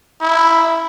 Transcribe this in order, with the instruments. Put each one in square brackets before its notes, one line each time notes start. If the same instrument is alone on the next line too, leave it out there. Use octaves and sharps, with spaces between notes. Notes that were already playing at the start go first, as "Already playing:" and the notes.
[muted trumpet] E4